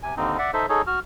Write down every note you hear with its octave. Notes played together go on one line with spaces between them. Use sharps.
C3 G#5
D#2 D3 C4 D#4
D5 E5 F#5
D#4 A4 C5 E5
D#4 G#4 A4 C#5
F#4 F6